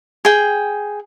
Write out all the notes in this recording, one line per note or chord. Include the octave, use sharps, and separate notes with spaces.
G#4 G5